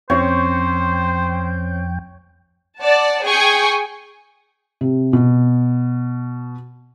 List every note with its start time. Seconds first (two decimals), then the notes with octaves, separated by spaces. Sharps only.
0.10 F2 C4 C#4 C5 C#5 G5
2.80 D5 F#5 A5
3.24 G#4 G5 G#5 C#6 D#6
4.81 C3
5.13 B2